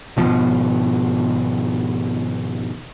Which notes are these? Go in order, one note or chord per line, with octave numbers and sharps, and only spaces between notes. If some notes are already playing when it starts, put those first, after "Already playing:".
G#1 B2 F3